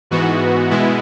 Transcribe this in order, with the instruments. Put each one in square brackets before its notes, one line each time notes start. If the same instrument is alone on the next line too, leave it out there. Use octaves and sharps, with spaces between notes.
[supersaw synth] G#2 E3 B3 F#4
B2 G#3 B3 E4